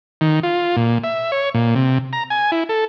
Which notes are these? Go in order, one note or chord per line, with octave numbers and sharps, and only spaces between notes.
D#3
F4
A#2
E5
C#5
A#2
C3
A#5
G#5
E4
A4